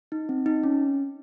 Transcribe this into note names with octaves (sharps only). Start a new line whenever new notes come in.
D#4
C4
D#4
C#4